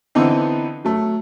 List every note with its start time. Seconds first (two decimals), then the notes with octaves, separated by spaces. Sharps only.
0.15 D3 E3 B3 C4 D#4
0.85 F#3 A3